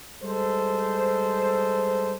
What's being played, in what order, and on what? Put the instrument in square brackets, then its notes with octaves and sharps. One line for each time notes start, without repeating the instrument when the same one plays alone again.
[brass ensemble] G3 G#3 A4 C5